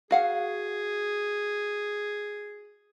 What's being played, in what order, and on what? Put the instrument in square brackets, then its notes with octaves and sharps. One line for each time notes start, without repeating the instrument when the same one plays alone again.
[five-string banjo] F#4 F5 F#5 [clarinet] G#4